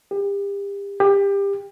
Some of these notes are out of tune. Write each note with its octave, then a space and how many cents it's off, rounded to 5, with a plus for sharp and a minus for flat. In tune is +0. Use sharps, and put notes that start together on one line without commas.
G4 +35
G4 +25